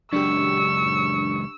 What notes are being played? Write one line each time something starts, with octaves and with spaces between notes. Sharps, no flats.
C#2 F#2 D4 G4 C#6 E6